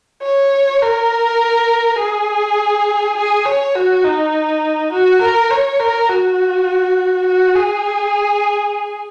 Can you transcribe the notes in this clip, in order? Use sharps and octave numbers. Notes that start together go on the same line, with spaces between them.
C#5
A#4
G#4
G#4
C#5
F#4
D#4
F#4
A#4
C#5
A#4
F#4
F#4
G#4